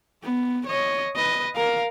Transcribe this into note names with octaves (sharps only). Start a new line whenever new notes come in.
B3
C#5 D#5
B4 D#5
A#4 F5